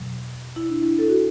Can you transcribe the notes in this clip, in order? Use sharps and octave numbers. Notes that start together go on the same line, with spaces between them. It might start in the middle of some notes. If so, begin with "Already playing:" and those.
Already playing: E2 B2 F#3
E4
D4
E4
A4
F#4